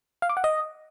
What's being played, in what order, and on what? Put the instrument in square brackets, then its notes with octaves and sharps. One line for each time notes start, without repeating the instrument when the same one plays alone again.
[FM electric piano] F5
D6
F#5
D#5